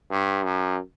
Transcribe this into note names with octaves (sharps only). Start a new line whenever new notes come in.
G2
F#2